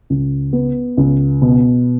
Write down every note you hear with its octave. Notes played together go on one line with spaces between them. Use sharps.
C#2
B3
C#2
B2